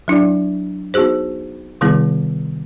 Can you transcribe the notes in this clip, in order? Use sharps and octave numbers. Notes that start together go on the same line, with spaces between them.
F#3 D4 E4 D5
B3 D#4 F#4 G#4 C5
C3 D#3 G3 B3 E4 G#4